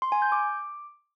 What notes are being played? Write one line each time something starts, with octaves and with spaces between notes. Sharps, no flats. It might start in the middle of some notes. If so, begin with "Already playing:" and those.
C6
G#5
G6
D6